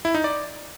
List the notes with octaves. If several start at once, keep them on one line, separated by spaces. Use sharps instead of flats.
E4
D#4
D5